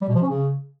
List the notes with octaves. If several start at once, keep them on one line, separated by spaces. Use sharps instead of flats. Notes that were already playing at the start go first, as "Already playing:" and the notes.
G3
B2
F3
C#4
C#3